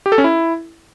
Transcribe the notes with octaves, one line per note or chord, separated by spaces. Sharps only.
G4
A4
C#4
E4